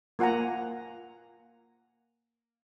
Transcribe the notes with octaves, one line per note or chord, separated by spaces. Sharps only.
A#3 F4 F#5 G#5 A#5